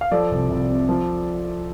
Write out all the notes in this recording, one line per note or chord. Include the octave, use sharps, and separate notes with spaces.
F5
F3 A4 D5
C2
C2
C3
F3